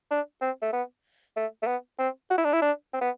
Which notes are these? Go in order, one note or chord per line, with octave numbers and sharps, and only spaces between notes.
D4
C4
A3
B3
A3
A3
B3
C4
F#4
E4
D4
E4
D4
C4
B3